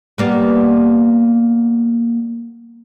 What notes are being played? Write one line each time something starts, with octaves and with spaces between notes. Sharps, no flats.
G3 A#3 B3